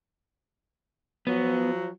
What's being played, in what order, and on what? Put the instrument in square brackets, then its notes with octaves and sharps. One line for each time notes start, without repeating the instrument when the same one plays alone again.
[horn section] F3 F#3 [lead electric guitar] B3